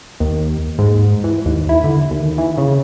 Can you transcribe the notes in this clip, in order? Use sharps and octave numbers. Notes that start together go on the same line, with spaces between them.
D#2
G#2
E3
D#2
E4
D3
D#2
E3
C#3